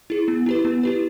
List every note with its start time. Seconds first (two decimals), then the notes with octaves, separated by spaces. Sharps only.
0.10 E4 G#4
0.28 B3
0.46 E4 G4 B4
0.65 B3
0.83 E4 G4 B4